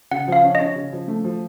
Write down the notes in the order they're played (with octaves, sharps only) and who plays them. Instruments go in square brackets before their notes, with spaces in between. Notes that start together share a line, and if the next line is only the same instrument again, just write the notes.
[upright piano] C#3 [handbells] F#5
[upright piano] F3 [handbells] F5
[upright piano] C#4
[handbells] D#5
[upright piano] C#4
C#3
F3
A3
F3